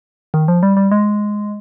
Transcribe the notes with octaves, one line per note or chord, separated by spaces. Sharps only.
D#3
F3
G3
G3
G#3